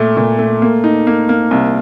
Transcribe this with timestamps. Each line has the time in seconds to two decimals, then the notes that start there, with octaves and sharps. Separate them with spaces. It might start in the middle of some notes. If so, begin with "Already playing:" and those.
Already playing: A#2 A3
0.17 A#2
0.39 A3
0.62 A#3
0.84 D#4
1.07 A#3
1.29 A#3
1.51 C2